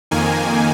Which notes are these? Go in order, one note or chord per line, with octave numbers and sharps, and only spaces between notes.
F2 D#3 A#3 G#5